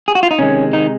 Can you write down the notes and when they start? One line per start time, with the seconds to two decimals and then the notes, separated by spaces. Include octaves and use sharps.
0.08 G#4
0.15 F#4
0.23 F4
0.31 D#4
0.39 C3 D#3 G#3 C#4
0.73 D#3 D#4